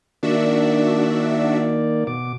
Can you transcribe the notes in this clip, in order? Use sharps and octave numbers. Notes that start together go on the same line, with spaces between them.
D#3 A#3 D4 F#4 D5 E5
B2 D6